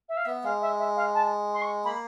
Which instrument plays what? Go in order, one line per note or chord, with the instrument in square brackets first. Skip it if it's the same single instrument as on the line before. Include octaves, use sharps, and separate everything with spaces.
[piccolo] E5
F5
[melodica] B3 [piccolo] E5
[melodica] G#3 [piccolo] F5
[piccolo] E5
E5
F5
A5
C6
C#6
[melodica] A#3 [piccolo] B5